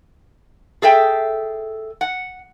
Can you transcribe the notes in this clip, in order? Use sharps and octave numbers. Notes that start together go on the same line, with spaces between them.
G#4 A4 E5 G5
F#5